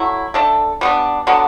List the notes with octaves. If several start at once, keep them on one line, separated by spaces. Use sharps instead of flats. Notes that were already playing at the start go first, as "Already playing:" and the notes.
Already playing: F#3 A3 E4
A3 D4 A4
G3 B3 D4
D3 F#3 B3 D4